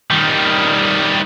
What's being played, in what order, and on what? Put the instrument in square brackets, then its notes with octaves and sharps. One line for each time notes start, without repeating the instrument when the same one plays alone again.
[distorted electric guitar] D#3 G3